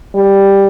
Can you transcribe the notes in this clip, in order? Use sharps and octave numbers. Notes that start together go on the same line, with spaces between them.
G3